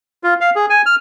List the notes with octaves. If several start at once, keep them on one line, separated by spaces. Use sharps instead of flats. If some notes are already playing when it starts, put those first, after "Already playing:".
F4
F5
G#4
G#5
F6